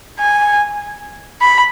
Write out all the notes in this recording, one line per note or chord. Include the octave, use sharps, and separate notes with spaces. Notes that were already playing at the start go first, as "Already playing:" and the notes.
G#5
B5